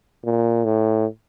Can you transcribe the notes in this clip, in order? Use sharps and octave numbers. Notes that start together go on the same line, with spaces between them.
A#2
A2